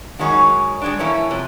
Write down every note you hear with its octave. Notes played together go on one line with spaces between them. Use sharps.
F#2 D#3 G#3 C#4 D#4 F#4
G3 G#3 D4
E3 A#3 C#4 E4 A4 C#5
C3 F3